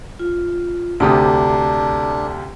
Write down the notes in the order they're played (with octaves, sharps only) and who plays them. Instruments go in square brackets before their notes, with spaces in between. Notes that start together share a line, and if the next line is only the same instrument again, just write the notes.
[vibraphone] F4
[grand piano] D2 C3 D#6 [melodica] D4 [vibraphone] A4 A#5